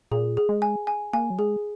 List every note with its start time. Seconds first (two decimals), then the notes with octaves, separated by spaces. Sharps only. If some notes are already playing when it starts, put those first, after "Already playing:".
0.11 A#2 G#4
0.37 G#4
0.49 G#3
0.62 G#5
0.87 G#5
1.13 A#3 G#5
1.30 F#3
1.39 G#3 G#4